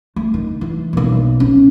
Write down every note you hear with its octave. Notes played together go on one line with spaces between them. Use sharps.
A3
D#3
E3
B1 A#2
C#4